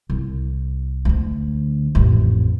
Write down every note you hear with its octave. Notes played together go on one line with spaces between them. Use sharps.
C2
D2 D3
A1 F2